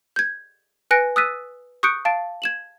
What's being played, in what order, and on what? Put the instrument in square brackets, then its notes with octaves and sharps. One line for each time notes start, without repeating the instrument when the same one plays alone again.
[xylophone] G6 G#6
B4 G#5 F#6 A#6 C#7 D7
D#6 E6 F#6 A6 B6 D#7
C#6 D#6 F#6 G6 C#7 D7
F5 A5 A6 D7
G#6 E7 F#7